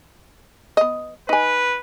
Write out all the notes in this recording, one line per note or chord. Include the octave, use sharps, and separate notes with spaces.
B3 D#5
D#4 B4 G#5